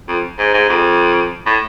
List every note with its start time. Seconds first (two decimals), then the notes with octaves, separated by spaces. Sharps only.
0.08 F2
0.39 G#2
0.54 G#2
0.69 F2
1.46 A2